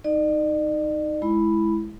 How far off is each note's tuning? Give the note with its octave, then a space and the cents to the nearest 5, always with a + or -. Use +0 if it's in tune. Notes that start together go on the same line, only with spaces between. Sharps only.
D#4 +0 D5 +45
G#3 +25 E4 +0 B5 +0